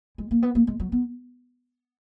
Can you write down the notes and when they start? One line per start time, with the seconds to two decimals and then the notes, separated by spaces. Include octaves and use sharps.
0.18 G#3
0.31 A#3
0.42 B3
0.55 A#3
0.67 G#3
0.80 F#3
0.92 B3